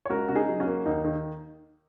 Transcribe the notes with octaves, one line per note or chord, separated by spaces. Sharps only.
C#5
C#2 F#4 A#4
C#3 F#4
D#4 G#4
F#3
C#4 F#4
A#3
D#2 D#4
D#3